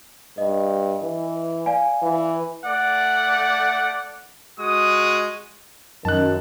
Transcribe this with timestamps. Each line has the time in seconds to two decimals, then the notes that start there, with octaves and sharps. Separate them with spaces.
0.38 G2 D#5
1.02 E3
1.66 D5 F5 G#5
2.02 E3
2.66 A3 D5 F#5
4.60 G#3 F#4 D#6
6.05 F#2 D#3 A5 F#6